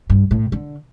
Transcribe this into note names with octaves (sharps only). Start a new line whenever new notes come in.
G2
A2
D3